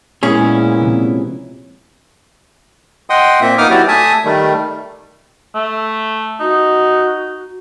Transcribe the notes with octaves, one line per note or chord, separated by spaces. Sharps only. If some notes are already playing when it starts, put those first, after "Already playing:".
A#2 G#3 B3 C#4 E4 G#4
C3 F3
D#5 F#5 G5 C6 D#6
A#2 A#3 C4 E5
A#3 B3 D#4 D6 D#6 F6
F#3 B3 E4 F#4 G4 D5
A3 E5 G#5 A5 D#6
D#3 G3 A3
A3
D#4 F#4